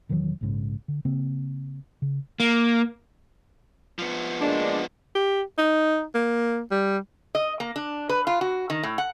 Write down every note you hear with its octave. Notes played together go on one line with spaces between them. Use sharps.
E1 D#3 E3 F#3
A#1 G#2 C#3
D3
C#3 A#3 C4
C#3
A#3
F3 B3
G#3 A#3 D4
G4
D#4
A#3
G3
D#5
A#3
D4
B4
F4
F#4
D#3
A2
F#5